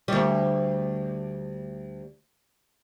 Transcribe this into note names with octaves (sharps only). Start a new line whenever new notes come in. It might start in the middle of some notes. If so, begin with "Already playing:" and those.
D2 G3